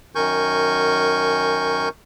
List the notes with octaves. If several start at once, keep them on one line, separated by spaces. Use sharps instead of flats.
F#2 D#3 A#4 G#5 C#6 G6